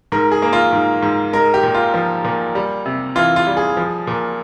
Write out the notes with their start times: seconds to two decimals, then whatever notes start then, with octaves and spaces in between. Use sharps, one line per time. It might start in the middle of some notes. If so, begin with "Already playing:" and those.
0.12 G#2 A#4
0.32 G#4
0.42 A#3
0.53 F4
0.73 G#2
1.02 G#2
1.33 G#3 A#4
1.54 G4
1.63 A#2
1.74 F4
1.94 F3
2.24 A#2
2.55 G3
2.86 C3
3.15 E3 F4
3.36 F4
3.47 G3
3.57 G#4
3.77 F3
4.07 A#2